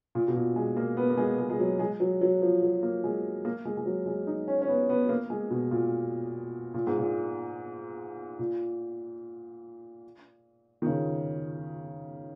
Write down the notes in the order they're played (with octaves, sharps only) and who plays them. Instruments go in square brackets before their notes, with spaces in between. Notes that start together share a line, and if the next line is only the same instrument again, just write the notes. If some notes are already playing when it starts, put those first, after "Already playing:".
[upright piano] A#2
B2
A#2
G#3
A#3
B3
A#3
G#3
G#3
G#3
F#3
G#3
F#3
F#3
F3
F#3
A#3
G#3
A#3
G#3
G#3
F#3
G#3
D#4
C#4
C#4
B3
B3
A#3
G#3
B2
A#2
A#2
G#2
A#2
A#2
D#3
C#3